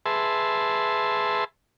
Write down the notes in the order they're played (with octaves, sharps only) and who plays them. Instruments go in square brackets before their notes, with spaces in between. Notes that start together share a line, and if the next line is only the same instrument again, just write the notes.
[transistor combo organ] G#4 B4 E5 A5 C6